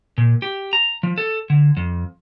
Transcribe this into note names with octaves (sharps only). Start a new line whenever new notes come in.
A#2
G4
A#5
F3
A4
D3
F2